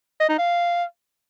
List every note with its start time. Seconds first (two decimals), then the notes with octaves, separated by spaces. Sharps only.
0.20 D#5
0.29 D#4
0.38 F5